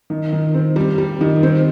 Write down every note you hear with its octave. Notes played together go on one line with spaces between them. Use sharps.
D#3
D#3
C4
G3
G3
D#3
C4